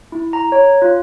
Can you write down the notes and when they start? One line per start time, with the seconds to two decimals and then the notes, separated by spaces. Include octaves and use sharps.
0.12 E4
0.33 A#5
0.52 C#5
0.82 F4